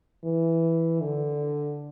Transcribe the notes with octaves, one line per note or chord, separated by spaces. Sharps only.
E3
D3